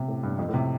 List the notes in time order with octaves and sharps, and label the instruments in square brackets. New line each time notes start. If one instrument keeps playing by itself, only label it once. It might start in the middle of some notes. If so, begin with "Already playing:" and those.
Already playing: [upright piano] C3
A2
G2
F2
A2
C3